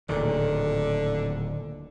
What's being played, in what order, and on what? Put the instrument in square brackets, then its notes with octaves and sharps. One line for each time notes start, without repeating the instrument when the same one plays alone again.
[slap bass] D1 A#2 D#3 [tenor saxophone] D3